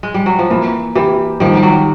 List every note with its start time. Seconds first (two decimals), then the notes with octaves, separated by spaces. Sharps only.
0.03 G#3
0.14 G3
0.26 F#3
0.39 F3
0.50 E3 A#3
0.95 E3 G4
1.40 D#3 F3 G3
1.57 G3
1.63 F#3